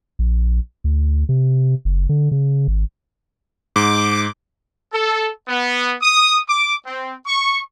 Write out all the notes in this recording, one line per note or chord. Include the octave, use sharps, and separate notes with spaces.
A#1
D2
C3
F#1
D3
C#3
G#1
G#2 D6
A4
B3
D#6
D6
C4
C#6